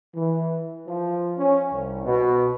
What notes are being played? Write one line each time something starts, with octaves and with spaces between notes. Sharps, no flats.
E3
F3
C#4
C2
B2